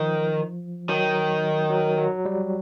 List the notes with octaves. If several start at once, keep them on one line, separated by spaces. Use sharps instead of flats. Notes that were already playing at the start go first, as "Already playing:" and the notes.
Already playing: D#3 F3
D#3 F#3
F#3
F#3
G3